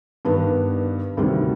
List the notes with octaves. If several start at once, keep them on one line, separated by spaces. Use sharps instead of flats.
G2 D#3 B3 D4
D2 C3 D#3 G3